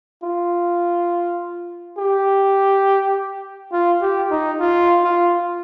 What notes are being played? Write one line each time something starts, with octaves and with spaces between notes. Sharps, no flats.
F4
G4
F4
G4
D#4
F4
F4